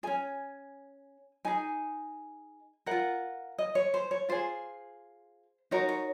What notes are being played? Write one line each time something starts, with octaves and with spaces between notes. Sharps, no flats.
C#4 G#4 G#5
D#4 G#4 G#5
F4 A#4 F#5
D#5
C#5
C5
C#5
F4 G#4 C5
D#4 F#4 A#4 C#5
C#5